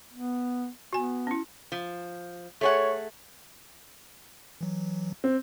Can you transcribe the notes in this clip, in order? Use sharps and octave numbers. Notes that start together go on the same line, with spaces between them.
B3
B3 F#4 G#5
C#4 E4
F3
A3 G#4 C#5 F#5
E3 F#3
C4